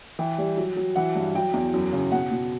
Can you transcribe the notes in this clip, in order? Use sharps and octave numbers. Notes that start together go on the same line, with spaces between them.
E3 G5
G3
F#3
F#3
E3 F#5
G2
F#3 G5
E2
F#2
C#3
B2 F#5
B2